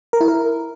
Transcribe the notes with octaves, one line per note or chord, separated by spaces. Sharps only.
A#4
E4
A#4